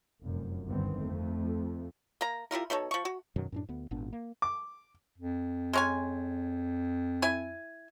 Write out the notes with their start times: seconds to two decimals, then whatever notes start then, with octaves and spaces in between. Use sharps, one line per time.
0.24 F1 F#2
0.64 G1 D2 G2 D#3 B3 C4
1.02 F2 A3
2.21 A#3 A#5
2.51 G3 E4 F4 A#4
2.70 B2 D#4 A4 C#5
2.91 F3 C#6
3.05 F#4
3.36 F#2 B2 D#3 F#3
3.52 F#2 A2 D4
3.69 D2 B3
3.91 G#1 A#2 B3 D4
4.13 A#3
4.42 D6
5.18 F2
5.73 G#3 C#4 G#5
7.22 E4 G#5